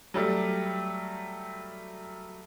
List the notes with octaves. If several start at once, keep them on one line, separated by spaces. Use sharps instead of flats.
F#3 G3 A3